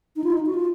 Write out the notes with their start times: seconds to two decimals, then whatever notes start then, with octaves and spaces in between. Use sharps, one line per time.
0.16 D#4
0.24 F4
0.32 D#4
0.46 F#4
0.54 F4